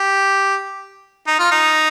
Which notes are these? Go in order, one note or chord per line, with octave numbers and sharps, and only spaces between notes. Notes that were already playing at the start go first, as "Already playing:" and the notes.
Already playing: G4
D#4
F4
D#4